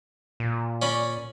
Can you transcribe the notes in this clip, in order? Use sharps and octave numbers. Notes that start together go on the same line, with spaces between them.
A#2
C#4 D5 B5